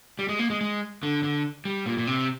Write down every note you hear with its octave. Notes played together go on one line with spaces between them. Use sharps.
G3
G#3
A#3
G#3
G#3
D3
D3
G3
A#2
A#2
C3